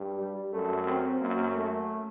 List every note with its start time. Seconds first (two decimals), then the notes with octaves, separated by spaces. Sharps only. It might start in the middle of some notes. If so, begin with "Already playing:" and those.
Already playing: G2
0.18 G3
0.52 F#2 A3
0.87 C4
1.21 F#2 A#3
1.56 A3